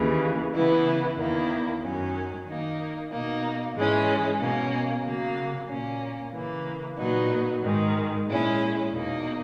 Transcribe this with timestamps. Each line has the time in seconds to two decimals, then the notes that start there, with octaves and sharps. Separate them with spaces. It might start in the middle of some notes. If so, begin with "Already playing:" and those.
Already playing: D#2 C#3 E3
0.52 C#3 E3 B3 E4
1.17 E2 D#3 A#3 E4
1.81 F#2 D#3 F#3 C#4
2.46 D#3 A#3 D#4
3.11 B2 A#3 D#4
3.75 G#2 E3 G#3 C#4 E4
4.39 B2 A#3 C#4
5.04 C#3 F#3 A#3
5.68 A#2 A#3 C#4
6.33 C#3 E3 A#3
6.97 A#2 F#3 B3 D#4
7.62 G#2 D#3 G#3
8.26 A#2 G#3 C#4 E4
8.90 E2 B2 A#3 D#4